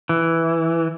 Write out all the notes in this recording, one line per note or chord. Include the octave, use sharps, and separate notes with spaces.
E3